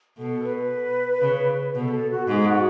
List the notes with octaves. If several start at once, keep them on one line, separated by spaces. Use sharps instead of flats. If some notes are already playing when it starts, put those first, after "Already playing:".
B2 A4
B4
C#3
B2 A4
A4
F#4
G#2 G#4
F#4